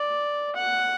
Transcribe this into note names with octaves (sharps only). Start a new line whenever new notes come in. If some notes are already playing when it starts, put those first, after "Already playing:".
Already playing: D5
F#5